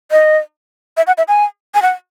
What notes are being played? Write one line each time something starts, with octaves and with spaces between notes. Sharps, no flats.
D#5
E5
F#5
E5
G#5
G#5
F#5